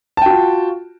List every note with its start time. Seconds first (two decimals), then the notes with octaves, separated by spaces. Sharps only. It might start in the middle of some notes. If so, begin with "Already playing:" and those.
0.17 A5
0.22 G5
0.26 F#4
0.30 F4